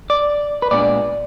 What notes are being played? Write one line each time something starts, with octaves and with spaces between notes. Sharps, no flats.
D5
B4
A#2 G#3 B3 D4 D5